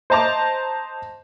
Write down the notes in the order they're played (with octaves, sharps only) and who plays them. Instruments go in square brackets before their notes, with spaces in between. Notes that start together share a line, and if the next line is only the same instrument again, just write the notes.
[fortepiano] C5 D#5 A5 A#5 D6